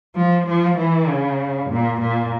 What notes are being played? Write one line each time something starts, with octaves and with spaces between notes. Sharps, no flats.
F3
F3
E3
C#3
A#2
A#2